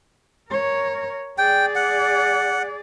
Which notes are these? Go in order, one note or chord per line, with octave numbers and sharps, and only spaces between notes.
A#4 C#5
G#4 D5 G5
F#5